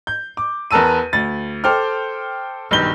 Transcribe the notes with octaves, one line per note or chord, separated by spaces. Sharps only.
G6
D6
E2 A#4 B4 A5 E6 D#7
D2 A6
A4 C5 G5 D6 F6
B1 G2 D#3 G6 G7